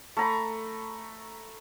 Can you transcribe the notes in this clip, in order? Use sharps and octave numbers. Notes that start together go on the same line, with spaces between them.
A3 A#5 B5